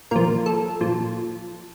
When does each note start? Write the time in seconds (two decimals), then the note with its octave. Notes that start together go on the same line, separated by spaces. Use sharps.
0.11 A#2 F3 A#4
0.46 A4
0.81 A#2 F3